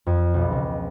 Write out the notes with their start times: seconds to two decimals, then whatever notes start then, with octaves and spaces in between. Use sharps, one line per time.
0.06 F2
0.34 B1
0.51 C#2